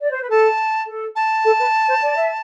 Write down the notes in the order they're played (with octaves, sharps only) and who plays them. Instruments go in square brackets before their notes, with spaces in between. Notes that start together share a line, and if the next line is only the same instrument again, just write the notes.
[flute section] D5
C5
B4
[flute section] A4 [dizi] A5
[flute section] A4
[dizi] A5
[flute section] A4
B4
C5
D5
E5